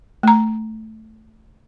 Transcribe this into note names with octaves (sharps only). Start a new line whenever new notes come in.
A3 A#5